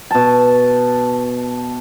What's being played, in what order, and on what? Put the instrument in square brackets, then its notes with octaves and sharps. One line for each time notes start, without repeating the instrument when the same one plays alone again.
[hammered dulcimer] B2 A5